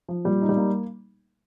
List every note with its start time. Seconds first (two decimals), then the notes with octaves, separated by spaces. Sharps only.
0.09 F3
0.25 A#2 G3
0.42 D#4
0.49 G3
0.57 A#3